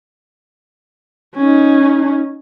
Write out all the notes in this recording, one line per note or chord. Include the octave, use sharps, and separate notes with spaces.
C#4 D#4